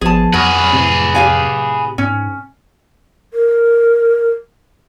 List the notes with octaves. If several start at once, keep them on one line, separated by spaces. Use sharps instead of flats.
G#1 F3 B3 G#4 A5
F2 F#3 G#4 B4 F#5 C#6 F6
A2 C3
G4 F5 G#5
G#2 C#4
A#4